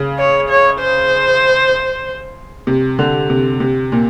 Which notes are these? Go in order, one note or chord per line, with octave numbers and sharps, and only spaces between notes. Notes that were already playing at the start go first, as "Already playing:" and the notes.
Already playing: C#3
C#5
C#5
C5
C3
D3
C3
C3
A#2